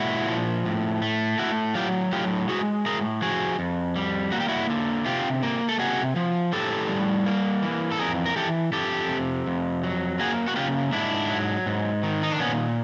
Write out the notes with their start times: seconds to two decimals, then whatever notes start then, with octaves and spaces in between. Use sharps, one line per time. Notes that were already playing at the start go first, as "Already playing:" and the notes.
Already playing: A#2 G#3 E4 F#4
0.28 F3
0.66 A2
1.02 A3
1.38 A2 E4 F#4
1.75 F#3 F4 G4
2.12 A2 F4 G4
2.48 G#3 F#4 G#4
2.85 A2 G#4 A#4
3.22 F3 F#4 G#4
3.59 F2
3.96 G3
4.32 A#3 F#4
4.40 G4
4.48 E4 F#4
4.70 D3
5.06 C3 F4 G4
5.43 A#3
5.69 A4
5.79 C3 F#4 G#4
6.16 F3
6.52 A2 G4 A4
6.89 G3
7.26 A#3
7.63 E3
7.92 A4
7.99 F2 G#4 A#4
8.26 A#4
8.36 E3 G4 A4
8.72 F2 G4 A4
9.09 C3
9.46 F2
9.84 F#3
10.19 A#3 F#4 G#4
10.48 F#4
10.56 C#3 F4 G4
10.93 G#2 D4 E4
11.29 F#3
11.66 G#2
12.03 D#3
12.23 D#4
12.32 D4
12.40 A#2 B3 C#4